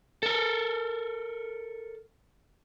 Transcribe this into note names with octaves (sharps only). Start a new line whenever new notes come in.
A4 A#4